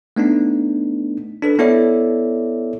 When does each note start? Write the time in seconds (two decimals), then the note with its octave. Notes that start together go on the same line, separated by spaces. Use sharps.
0.16 A3 B3 D4 D#4
1.42 D4 A4 B4
1.59 B3 E4 A4 C#5 D5 E5